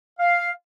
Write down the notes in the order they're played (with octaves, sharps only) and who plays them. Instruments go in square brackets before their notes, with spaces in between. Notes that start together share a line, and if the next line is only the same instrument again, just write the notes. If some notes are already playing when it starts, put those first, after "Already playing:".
[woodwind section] F5